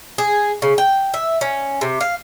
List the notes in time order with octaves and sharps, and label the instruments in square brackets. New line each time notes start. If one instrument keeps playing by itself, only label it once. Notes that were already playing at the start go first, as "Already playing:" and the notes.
[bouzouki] G#4
C#3
G5
E5
C#4
C3
F5